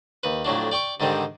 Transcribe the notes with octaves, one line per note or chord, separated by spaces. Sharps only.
D#2 B4
F2 A2 F#3 D4
D5 G5 C#6 D6
G#2 D3 D#3 G3 C4